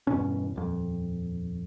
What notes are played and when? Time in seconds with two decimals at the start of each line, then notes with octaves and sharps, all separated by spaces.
0.07 E2 G2 B2 C#4
0.56 D#1 F2